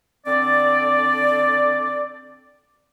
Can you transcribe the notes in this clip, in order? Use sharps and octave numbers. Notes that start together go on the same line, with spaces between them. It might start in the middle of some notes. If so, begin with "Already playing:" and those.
D3 C4 D5